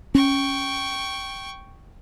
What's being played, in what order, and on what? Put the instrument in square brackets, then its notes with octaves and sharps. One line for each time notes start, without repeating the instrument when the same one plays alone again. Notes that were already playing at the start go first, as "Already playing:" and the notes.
[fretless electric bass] C#4 [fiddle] G5 C#6